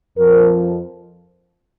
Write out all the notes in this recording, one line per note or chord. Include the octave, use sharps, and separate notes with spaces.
F2 F3 A#4